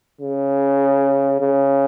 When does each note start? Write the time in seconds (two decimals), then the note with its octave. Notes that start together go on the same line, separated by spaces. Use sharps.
0.21 C#3
1.41 C#3